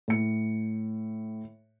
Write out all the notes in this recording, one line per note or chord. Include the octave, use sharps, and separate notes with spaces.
A2 C#7